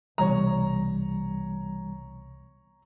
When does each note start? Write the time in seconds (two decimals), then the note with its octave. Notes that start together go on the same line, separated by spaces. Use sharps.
0.18 C2 B2 E3 G3 C#5 A#5